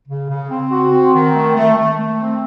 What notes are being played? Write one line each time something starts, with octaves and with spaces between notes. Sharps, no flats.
C#3
C#3
C4
F#4
C4
D#3
A3
A3
A3
A3
C4